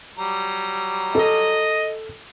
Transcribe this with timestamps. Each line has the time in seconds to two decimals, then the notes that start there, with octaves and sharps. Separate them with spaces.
0.18 F#3 G3 A#5
1.15 A4 D#5